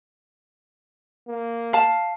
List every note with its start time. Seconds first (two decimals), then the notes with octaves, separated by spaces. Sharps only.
1.28 A#3
1.73 F5 A5